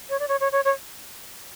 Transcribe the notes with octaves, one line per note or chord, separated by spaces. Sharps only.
C#5
D5
C#5
C#5
C#5
C#5